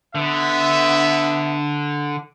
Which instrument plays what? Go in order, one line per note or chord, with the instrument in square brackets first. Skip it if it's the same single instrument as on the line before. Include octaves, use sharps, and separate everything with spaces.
[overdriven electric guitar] D3 [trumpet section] B3 E5